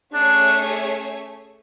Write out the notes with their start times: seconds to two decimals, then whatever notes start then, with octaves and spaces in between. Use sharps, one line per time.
0.13 A3 C#4 D4 G#4 C#5 E5